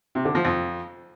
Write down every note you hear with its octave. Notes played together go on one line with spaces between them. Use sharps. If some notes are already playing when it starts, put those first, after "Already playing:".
C3
D3
F3
F2